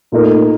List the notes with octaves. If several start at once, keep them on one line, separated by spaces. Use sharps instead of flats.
A#2 A3 D#4 A#4